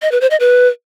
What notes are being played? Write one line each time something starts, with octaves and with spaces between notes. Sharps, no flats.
D#5
B4
C5
D#5
B4